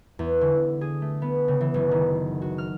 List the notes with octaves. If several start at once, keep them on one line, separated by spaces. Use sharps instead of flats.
E2
D3
G#4
A3
B3
C#3
E3
F#1
D#3
F#4
F6